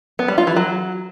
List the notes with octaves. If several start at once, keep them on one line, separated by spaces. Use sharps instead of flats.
B3
G3
F4
E3
F#3